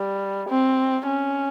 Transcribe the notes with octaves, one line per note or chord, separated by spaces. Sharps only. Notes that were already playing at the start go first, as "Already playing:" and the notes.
Already playing: G3
C4
C#4